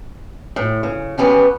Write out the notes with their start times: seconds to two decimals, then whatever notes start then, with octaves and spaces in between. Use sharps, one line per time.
0.56 A2
0.83 C#3
1.18 E2 B3 C#4 G4